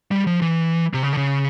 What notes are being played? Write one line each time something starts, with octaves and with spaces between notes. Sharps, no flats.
G3
F3
E3
C3
C#3
D3
C#3